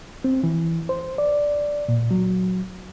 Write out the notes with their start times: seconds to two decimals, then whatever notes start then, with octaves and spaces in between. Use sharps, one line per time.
0.24 C4
0.44 E3
0.89 C5
1.18 D5
1.89 A#2
2.11 F#3